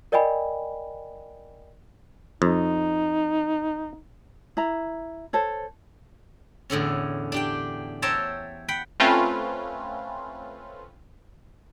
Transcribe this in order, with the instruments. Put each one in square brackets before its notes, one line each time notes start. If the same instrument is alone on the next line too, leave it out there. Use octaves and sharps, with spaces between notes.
[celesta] A#4 D5 D#5 G5 G#5 B5
[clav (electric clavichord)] F2 [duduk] D#4
[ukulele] E4 A#5
A4 C5 C#5
[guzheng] E2 A2 D3 C#4
D4 G4 G5
C5 C#5 E5 G5 A5 A#5
F#5 G5 B5
[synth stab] A3 C4 C#4 F4 B4